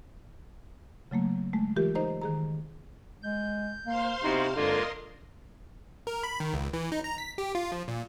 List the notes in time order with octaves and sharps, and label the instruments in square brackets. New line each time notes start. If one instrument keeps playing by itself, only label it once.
[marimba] C#3 F#3 A3 A#3
G#3 A3
E3 F4 G4 A#4
D#4 C5 D#5 A#5
D#3 G#4 A#5
[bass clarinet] G#3 [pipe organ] G6
[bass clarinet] A#3 [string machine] C5 F5 C6
[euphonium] C3 [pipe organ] B3 E4 F#4 [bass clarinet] D#4
[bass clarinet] G2 [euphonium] D3 [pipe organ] G#3 A#3 F4 [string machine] A#4 D#5 C6
[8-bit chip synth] A#4
B5
D#3
C#2
E3
D#4
A#5
B6
G4
F4
F3
A#2